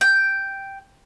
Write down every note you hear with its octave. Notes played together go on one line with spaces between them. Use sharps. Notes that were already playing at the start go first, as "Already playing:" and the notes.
G5